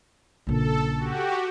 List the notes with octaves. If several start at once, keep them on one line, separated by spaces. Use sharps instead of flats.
A#1 C#3 A4
F#4 G4